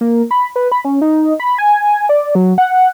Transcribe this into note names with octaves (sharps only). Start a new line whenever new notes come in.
A#3
B5
B4
B5
C#4
D#4
B5
G#5
D5
F#3
F#5